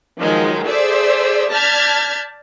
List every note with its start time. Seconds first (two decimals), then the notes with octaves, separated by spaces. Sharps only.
0.21 D#3 F3 F#3 G#3 D#4
0.67 G#4 A4 C5 D5 E5 E6
1.52 D5 A5 F6 G6 G#6 B6